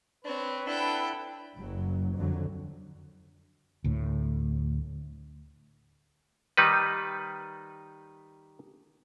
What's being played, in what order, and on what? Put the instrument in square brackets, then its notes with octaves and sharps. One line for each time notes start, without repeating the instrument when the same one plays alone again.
[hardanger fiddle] C4 C#5 [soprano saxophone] D4 [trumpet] B4
[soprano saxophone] D4 [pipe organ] E4 F#5 B5 [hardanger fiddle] A4 G5
[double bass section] F#1 F#3
F2 D3 F#3
[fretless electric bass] D2 A2
[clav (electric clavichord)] D#3 G3 D#4 B4